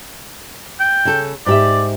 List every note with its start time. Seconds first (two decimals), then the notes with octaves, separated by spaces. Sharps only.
0.80 G5
1.05 C#3 A4
1.46 G#2 G4 D5 E5